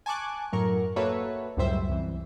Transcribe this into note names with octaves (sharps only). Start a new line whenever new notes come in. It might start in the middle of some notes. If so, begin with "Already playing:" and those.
G#5 A5 C#6 D6 F#6
F#2 A2 F#3 A#4 C#6
A#3 F#4 A4 B4 C#5 E5
C#2 F#2 A2 G3 C5 E5
C2 E3